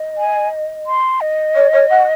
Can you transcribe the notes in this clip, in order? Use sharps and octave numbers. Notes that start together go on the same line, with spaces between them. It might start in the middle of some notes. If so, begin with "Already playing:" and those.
Already playing: D#5
G#5
C6
D#5
C#5
C#5
F#5